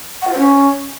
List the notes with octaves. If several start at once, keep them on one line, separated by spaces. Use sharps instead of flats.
F#5
F4
C5
C#4